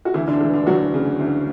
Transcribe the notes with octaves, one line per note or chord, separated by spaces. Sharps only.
F#4
D2 E3 E4
D3 D4
E1 E3 E4
D3 D4
E1 F#3 F#4
C#3
D2